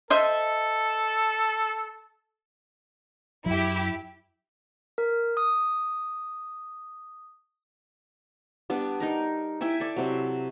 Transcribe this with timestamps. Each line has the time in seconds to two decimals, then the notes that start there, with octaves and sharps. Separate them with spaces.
0.10 A4 C5 D#5 E5
3.46 F#2 F#3 E4 G4
4.98 A#4
5.37 D#6
8.70 G3 B3 D4
9.00 D#4 A#4 A#5
9.61 E4 E5 G5 G#5
9.80 A4 D5
9.96 C3 F#3